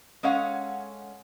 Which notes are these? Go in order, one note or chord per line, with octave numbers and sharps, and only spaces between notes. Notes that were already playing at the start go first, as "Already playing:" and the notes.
G#3 C#4 A4 C#5 F5 F#5